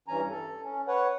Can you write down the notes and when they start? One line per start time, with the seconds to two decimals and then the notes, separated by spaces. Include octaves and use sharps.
0.08 G2 E3 C#4 G#5 A#5
0.30 A4
0.64 C#4
0.88 B4 C#5 F#5